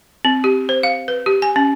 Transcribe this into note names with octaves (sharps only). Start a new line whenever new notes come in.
C4
G4
C5
F5
B4
G4
G#5
C#4